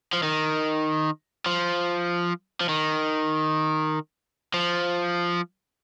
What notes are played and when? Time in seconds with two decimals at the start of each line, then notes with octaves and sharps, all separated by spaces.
0.13 F3
0.23 D#3
1.46 F3
2.61 F3
2.69 D#3
4.54 F3